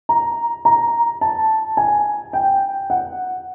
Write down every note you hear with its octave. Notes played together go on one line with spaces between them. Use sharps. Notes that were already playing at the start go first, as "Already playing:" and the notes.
A#5
A#5
A5
G#5
G5
F#5